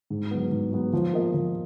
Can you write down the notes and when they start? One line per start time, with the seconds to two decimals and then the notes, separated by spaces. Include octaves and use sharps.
0.10 G#2
0.31 F#3 B3
0.52 G#2
0.72 F#3 B3
0.93 F3
1.13 A#3 F4 A#4 D#5
1.34 F3